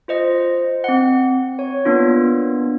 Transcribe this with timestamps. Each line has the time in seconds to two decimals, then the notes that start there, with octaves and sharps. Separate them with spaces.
0.08 F4 C5 D#5
0.84 C4 F#5
1.59 C#5
1.85 A#3 B3 D4 F4